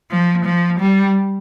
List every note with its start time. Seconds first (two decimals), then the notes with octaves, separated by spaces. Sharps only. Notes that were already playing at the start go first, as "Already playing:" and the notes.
0.11 F3
0.46 F3
0.80 G3